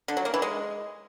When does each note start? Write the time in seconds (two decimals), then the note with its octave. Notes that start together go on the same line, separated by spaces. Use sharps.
0.08 D3
0.17 F#3
0.25 A#3
0.34 E3
0.42 G#3